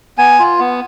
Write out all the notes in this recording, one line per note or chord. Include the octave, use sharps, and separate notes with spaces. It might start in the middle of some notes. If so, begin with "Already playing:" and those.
B3 G#5
F4
B3